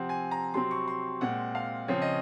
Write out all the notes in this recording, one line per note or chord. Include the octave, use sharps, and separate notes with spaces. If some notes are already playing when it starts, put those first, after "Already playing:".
Already playing: C3 F3 C4 F#5
G#5
A#5
C3 F#3 C4 C6
C#6
C6
A#2 G#3 C4 F#5
F5
C#3 F3 C4 C#5
D#5